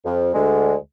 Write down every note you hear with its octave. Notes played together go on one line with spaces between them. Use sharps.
F2
D2 D3 G#3